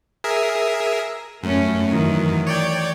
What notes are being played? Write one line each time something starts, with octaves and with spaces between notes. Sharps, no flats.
G#4 A#4 E5
F#2 A3 C#4
D#3 E3 F#3
C#5 D5 G5